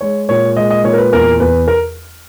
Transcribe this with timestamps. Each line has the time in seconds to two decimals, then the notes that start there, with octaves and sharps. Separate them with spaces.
0.01 G#3 C#5
0.29 A#2 C#5
0.56 G#3 D#5
0.70 D#5
0.84 A#2 C#5
0.93 A#4
0.98 B4
1.13 E2 A#4
1.39 E2 B4
1.68 A#4